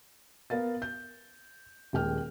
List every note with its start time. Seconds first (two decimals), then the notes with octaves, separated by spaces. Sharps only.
0.50 B3 A#4 F5 A6
0.82 G6
1.93 D#1 G#3 G5 F6